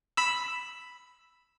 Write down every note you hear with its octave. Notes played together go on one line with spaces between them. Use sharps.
B5 E6